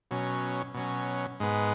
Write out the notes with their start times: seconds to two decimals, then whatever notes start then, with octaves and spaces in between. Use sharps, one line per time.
0.11 B2 F#3 C#4
0.74 B2 F#3 C#4
1.40 G#2 G#3 B3